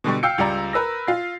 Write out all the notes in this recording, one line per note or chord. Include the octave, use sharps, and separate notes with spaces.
B2 D3 G3 C#6
F5 G5 E6 G6 C#7
C#2 G3 D5 A#5
A#4 B4 E6 A#6
F4 C7